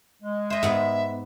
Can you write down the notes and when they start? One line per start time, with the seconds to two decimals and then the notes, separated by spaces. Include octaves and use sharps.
0.22 G#3
0.50 C5 D#5 E5
0.63 G#2 B3